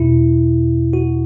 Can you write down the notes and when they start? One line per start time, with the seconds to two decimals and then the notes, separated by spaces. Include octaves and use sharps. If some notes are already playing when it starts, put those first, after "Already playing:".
Already playing: E2 B2 E4
0.93 F#4